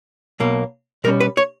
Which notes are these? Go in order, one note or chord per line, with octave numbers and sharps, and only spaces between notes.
B1 B2 A#3
B2 G3 C#4 A#4
B4
C#5